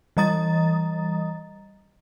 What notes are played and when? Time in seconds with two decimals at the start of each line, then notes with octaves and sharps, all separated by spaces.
0.17 E3 G3 D#5 A#5 D#6 A6